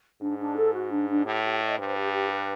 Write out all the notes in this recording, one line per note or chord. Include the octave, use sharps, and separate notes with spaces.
G#2 D4
D4
A4
F#4
D4
D4
A2 G4
G4
D#5
G2 C5
G4
G4
B4